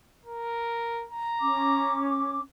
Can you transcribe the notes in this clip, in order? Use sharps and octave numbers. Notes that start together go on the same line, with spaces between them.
A#4
A#5
C#4 D6